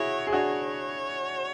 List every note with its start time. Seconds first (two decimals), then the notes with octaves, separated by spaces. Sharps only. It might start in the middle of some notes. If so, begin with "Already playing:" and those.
Already playing: E4 F#4 G#4 C#5
0.27 G#4
0.33 D4 F#4 C#5